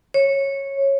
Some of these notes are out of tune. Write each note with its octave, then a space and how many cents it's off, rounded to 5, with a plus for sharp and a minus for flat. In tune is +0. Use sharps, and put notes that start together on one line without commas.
C#5 -15